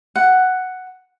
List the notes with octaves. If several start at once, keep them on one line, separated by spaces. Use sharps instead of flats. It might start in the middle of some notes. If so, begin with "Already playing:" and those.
F#5